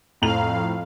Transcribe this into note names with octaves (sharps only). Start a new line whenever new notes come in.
F2 A2 F5 A#5 F7